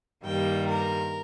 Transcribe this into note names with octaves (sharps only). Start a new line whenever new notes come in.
G2 D#3 G3 A#3 G5
A#4